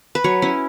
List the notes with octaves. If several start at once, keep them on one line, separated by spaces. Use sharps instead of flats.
B4
F#3 C#5
C#4 E4